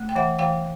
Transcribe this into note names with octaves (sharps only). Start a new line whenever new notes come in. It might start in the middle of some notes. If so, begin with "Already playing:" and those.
Already playing: A3
G5
E3 E5 F#5
E3 F5 G5